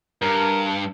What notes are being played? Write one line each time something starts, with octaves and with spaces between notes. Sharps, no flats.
G2 A#4